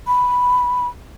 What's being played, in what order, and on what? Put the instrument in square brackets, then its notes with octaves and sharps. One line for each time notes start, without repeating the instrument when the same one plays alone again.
[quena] B5